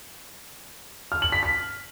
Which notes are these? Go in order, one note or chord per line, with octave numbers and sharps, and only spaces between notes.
F6
F#7
B6
B6